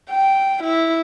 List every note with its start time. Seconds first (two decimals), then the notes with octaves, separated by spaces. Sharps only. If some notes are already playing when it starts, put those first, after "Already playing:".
0.10 G5
0.63 E4